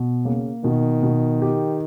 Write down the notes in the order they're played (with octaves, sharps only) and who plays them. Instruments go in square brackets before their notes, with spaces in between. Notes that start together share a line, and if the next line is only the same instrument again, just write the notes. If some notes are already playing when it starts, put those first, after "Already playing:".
Already playing: [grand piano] B2
[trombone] C#3 [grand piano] A#3
[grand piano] B2 [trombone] D#3
[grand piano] B2
G4